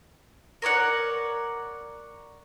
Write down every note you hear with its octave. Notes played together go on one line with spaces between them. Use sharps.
A#4 C#5 D5 F#5